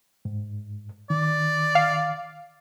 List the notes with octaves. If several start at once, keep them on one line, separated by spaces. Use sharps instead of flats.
G#2
D#3 D5
F5